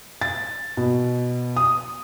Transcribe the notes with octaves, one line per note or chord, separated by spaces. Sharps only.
A6
B2
D#6